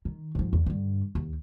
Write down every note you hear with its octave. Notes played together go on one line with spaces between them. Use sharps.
D#3
G#2 F3
E2
G2 D3
D#2